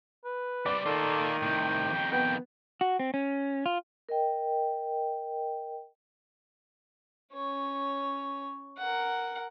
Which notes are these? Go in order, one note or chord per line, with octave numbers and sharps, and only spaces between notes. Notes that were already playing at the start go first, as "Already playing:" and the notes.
B4
G3 C4 D5 D6
D#3 A#3 F4 A4
A2 C3 G5
F2 D#3
B3 G5
F#4
C4
C#4
F4
A#4 D#5 G5
C#4 C#5
A#4 F#5